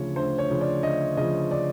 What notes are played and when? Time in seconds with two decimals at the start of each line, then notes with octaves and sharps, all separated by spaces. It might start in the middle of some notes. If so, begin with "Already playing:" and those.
Already playing: D2 C#3 F3 C#5
0.16 D2 C5
0.38 C#5
0.50 C#3 F3
0.61 D5
0.83 D2 D#5
1.17 C#3 F3 D#5
1.51 D5